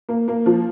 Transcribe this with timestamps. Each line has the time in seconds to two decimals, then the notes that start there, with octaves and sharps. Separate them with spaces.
0.09 A#3
0.28 A#3
0.46 F3